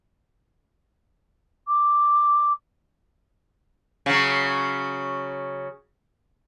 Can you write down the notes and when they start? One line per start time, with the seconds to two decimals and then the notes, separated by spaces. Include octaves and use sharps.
1.68 D6
4.06 C#3 F#3